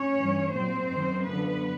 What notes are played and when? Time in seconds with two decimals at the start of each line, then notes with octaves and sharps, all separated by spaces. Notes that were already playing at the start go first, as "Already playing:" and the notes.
Already playing: C#4 C#5
0.18 G2 E3
0.53 A#2 F#3 C4 C5
0.89 F#2 D#3 F#3
1.26 F#2 D3 F3 B3 B4